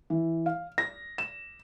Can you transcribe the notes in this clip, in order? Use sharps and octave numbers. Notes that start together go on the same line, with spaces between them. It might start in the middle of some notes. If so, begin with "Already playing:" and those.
E3
F5
A#6
E7